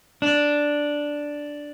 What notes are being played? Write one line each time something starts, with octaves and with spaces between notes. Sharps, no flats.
D4